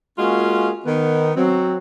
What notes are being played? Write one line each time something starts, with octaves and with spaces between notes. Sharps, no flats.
G#3 A#3 C#4 F4 F#4 G#4
D#3 B3
F#3 C4